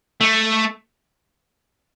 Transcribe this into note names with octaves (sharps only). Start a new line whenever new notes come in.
A3